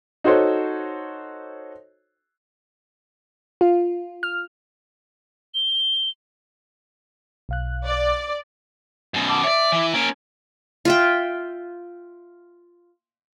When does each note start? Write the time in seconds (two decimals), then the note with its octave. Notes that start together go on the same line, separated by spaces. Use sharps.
0.24 D#4 F#4 A4 C5 C#5
3.61 F4
4.23 F6
5.54 G7
7.49 B1 F5 F#6
7.85 D5
9.14 F#2 B2
9.29 A5 D6
9.44 C#5 D5 E5
9.72 E3
9.94 A#3 C#4 D7
10.85 F4 E5 G5